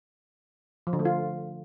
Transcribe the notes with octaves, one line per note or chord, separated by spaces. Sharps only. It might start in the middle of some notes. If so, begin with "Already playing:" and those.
F3
D3
A3
F4